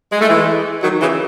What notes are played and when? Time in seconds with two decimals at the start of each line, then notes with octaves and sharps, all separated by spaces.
0.11 G#3
0.20 A3
0.29 E3 G#3
0.83 D#3 F#3
1.00 C#3 E3